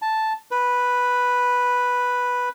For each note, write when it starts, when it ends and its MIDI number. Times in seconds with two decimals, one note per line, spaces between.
0.02 0.33 81
0.51 2.49 71